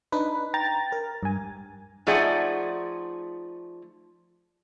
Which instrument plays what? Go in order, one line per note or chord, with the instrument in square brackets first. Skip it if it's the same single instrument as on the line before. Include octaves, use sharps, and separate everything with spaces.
[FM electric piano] D4 D#4 B4
G5 A#5 A6
A#4
G2 G#5
[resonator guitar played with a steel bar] F3 A3 D#4 G#4 D5 F#5